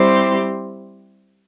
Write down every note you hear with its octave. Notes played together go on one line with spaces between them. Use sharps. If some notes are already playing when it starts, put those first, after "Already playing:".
Already playing: G3 C4 E4 G4 C5